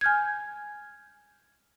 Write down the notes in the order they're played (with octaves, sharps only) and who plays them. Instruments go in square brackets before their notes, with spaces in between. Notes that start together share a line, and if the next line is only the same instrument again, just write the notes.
[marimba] G#5 F6 G6 G#6